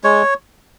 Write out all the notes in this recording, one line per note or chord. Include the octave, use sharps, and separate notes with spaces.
G#3 C#5